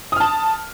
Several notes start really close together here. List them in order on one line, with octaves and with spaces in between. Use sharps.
D#6 F6 A5